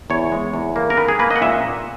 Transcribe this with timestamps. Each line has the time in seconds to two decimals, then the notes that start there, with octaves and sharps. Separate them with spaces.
0.10 E2 C#5
0.32 G#3
0.54 E2
0.76 A#3
0.90 A#4
0.97 D#3 B4
1.08 G#4
1.19 A#3 B4
1.31 D#5
1.36 F#5
1.42 A#2 E5